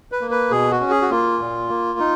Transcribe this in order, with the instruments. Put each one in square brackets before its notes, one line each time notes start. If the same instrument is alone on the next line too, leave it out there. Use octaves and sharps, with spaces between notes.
[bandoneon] B4
A#3
B4
B2 G#4
F#4
C#4
G#4
F#4
A#3 F4
A#2
A#3
D#4